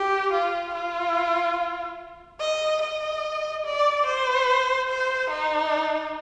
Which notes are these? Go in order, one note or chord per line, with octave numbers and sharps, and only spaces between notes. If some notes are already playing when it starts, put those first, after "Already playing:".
Already playing: G4
F4
F4
D#5
D#5
D5
C5
C5
D#4